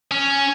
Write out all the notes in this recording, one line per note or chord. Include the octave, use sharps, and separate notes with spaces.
C#4